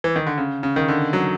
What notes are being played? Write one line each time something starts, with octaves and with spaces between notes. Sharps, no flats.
E3
D#3
D3
C#3
C#3
D#3
D3
F#3